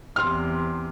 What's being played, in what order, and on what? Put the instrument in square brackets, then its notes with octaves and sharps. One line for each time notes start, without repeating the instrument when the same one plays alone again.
[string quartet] E2 C3 [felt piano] C6 F6